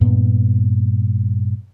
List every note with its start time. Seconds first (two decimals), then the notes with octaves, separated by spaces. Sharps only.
0.01 G2 A#2 B3